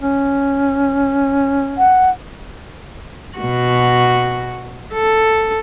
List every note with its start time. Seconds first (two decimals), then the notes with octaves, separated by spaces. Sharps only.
0.02 C#4
1.78 F#5
3.37 B2 F#4
4.94 A4